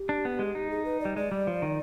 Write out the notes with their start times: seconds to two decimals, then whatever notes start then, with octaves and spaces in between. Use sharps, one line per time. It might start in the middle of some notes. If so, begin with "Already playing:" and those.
Already playing: G4
0.09 D4
0.25 B3
0.39 G#3
0.55 D#4
0.71 G#4
0.85 B4
1.00 G3 D5
1.16 G#3 D5
1.31 G3
1.47 F3
1.62 D#3